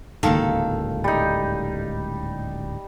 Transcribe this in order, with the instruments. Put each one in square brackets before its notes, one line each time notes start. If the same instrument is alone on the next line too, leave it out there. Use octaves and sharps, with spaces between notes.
[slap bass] D1 C#2 G#2 [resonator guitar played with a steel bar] D#3 A4 [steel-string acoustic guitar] A#3 F5
[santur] G3 D#4